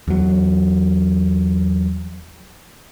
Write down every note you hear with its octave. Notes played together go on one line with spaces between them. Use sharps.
E2 F#3